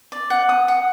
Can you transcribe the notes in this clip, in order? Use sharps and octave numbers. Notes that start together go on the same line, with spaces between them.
D5
F#5
D#6
F#5